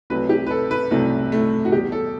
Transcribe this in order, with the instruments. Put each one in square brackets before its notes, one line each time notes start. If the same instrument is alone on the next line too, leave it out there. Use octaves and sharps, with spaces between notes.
[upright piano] C2 C3 F#3 A3 B4
G4
B4
A4
B4
C2 C3 F#3 A3
A3
F#4
E2 B2 G3 G4
A4